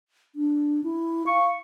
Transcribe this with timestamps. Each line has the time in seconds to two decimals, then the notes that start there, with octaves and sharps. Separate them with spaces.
0.36 D4
0.84 E4
1.27 F5 C#6